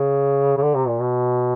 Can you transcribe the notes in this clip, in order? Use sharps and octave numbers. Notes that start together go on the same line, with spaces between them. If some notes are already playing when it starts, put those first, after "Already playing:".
Already playing: C#3
C#3
D3
C3
A#2
B2